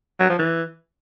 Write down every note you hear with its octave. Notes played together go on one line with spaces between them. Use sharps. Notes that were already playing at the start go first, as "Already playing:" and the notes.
F#3
F3
E3